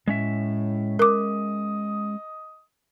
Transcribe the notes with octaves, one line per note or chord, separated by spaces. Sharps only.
A2 G#3 C#4 E5
A#4 D#5 D6 D#6